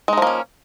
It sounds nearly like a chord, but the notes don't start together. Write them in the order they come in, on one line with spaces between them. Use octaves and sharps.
G#3 D#4 F3 A#3 C#4